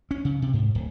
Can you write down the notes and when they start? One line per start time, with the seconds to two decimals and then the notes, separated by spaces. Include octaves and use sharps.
0.11 C#4
0.25 C#3
0.42 C3
0.53 G#2
0.75 D1